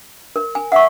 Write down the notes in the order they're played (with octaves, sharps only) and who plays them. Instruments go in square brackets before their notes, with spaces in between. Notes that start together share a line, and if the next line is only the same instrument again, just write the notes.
[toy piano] A#4
G#5
[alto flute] E5 [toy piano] F#5 C#6